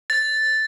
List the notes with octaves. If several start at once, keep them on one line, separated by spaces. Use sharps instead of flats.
A6